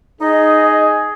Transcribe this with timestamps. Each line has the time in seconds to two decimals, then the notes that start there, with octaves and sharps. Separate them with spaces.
0.21 D#4 G#4 D#5